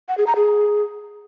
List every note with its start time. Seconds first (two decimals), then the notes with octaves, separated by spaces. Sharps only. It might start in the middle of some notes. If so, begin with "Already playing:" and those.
0.09 F#5
0.18 G#4
0.27 A#5
0.36 G#4